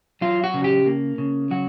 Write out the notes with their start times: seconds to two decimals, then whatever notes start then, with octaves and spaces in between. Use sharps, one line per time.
0.21 F#3 F4
0.44 F#4
0.54 C#3
0.64 G4
0.86 A#3
1.18 C#3
1.51 F#3 F#4